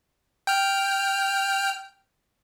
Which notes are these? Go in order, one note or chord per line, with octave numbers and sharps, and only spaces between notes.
G5 F6